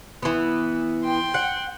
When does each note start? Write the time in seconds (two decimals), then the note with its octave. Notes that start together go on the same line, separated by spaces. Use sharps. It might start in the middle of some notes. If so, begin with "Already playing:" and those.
0.23 E3 B3
1.05 G5 C6
1.34 F#5